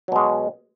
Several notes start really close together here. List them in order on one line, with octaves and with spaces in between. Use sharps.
F#3 B2 G#3